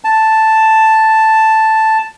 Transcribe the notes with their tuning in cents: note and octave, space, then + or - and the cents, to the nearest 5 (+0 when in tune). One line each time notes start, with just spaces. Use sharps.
A5 +0